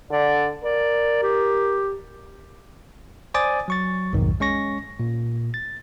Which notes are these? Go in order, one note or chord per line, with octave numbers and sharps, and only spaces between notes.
D3 D5
A#4 D5
G4
C5 D5 G#5 D6 D#6 A6
F#3 C#6 A6
B1 F2 G#2 D#3
G#3 C#4 C#6 A#6
A#2
A6